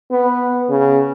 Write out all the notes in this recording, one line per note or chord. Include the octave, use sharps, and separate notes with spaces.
B3
C#3